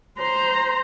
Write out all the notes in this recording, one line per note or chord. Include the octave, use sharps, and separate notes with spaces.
C5 A#5